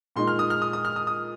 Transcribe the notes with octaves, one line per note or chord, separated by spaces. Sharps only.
A#2 G#3 D#4 C6
F6
D#6
F6
D#6
D#6
F6
D#6
D#6